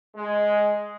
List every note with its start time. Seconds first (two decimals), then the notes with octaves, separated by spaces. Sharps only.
0.16 G#3